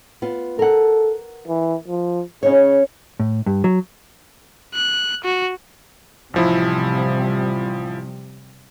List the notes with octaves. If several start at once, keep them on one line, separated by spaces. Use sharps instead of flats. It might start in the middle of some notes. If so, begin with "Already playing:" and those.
B3 F4
A4 A#4 F#5
E3
F3
C#3 C#4 D#4 C#5
A2
G2
F#3
F#6
F#4
A1 C3 F3 G3 E4